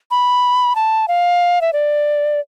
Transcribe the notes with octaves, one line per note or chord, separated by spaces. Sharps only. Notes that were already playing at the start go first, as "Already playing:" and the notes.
B5
A5
F5
E5
D5